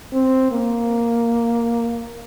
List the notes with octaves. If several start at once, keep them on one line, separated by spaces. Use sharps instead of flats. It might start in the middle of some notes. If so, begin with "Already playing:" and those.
C4
A#3